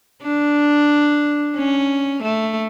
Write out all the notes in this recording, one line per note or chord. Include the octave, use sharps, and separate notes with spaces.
D4
C#4
A3